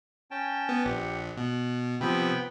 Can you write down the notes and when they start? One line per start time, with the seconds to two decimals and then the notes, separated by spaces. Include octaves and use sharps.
0.31 C#4 G5 A5
0.69 B3
0.85 A#1 G4 F#5
1.37 B2 F#6
2.01 C3 F3 B3 G5 B5